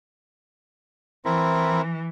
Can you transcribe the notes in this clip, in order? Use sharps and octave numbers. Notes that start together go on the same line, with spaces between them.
E3 C4 E4 A#4